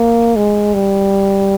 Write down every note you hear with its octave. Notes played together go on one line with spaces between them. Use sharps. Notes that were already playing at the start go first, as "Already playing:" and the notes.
Already playing: A#3
G#3
G3